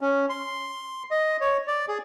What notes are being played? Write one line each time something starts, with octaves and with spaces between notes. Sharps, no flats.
C#4
C6
D#5
C#5
D5
G#4